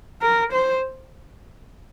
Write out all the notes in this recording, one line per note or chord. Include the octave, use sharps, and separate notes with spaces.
A#4
C5